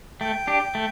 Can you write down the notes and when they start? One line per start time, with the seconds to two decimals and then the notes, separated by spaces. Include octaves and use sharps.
0.20 A3 G5
0.47 D4 G4
0.75 A3